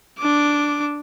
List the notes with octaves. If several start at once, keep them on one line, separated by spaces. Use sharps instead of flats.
D4 D6